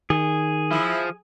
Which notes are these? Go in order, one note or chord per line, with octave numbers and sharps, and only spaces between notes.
D#3 G#4
F3 E4